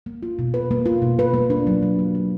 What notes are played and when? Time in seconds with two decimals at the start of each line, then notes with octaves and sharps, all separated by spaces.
0.06 A#3
0.23 F4
0.39 B2
0.54 B4
0.71 A#3
0.86 F4
1.02 B2
1.19 B4
1.34 A#3
1.50 D4
1.67 F#3
1.83 F#3
1.99 A#3
2.15 D4